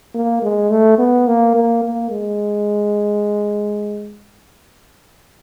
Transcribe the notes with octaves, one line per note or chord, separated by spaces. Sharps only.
A#3
G#3
A3
B3
A#3
A#3
A#3
G#3